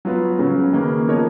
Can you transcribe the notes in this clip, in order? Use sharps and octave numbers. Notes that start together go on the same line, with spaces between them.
F#3 B3 F4 B4
C#3 F#3 C#4
D#3 A#3 C#4 G#4 B4
F3 B3 D#4 A#4 C#5